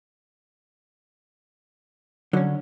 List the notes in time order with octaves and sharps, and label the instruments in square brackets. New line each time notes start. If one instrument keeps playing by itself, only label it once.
[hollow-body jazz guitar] D3 [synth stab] F#3 C#4